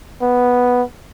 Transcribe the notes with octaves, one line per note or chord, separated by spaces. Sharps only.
B3